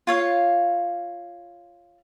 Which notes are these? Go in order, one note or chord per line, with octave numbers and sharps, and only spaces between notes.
F4 C#5 F5